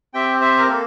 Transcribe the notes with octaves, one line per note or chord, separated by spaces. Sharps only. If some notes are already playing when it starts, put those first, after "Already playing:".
C4 G4 E5 G5
C5 E5
A#4
A#3 A4